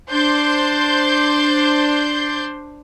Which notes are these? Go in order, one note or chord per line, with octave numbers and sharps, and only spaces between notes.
D4 C5 C6 G6